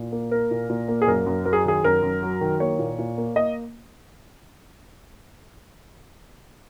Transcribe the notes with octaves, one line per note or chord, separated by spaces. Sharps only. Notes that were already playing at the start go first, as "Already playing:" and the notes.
Already playing: A#2
A#3
A#3 A#4
A#2
A#2
A#3
G#4
F#2 A#4
F#2
F#3 A#4
G#4
D#3 G#4
F#2 A#4
F#2
F#3
D#3
A#3 C#5
A#2
A#2
A#3
A#3 D#5